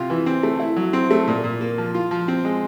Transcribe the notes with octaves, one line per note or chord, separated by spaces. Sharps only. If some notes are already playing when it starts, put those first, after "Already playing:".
Already playing: C3 F4
E3
C4
A3
E4
F#3
C4
A3
A#2
A#2
A#3
F3
F4
F3
C4
G#3